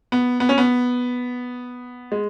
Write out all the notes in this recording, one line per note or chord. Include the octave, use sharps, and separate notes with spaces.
B3
B3
C#4
B3
G#3